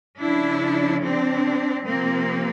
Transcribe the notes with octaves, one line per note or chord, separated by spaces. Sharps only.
C#3 F3 D4 E4
C4 D4
C3 F3 A#3 C4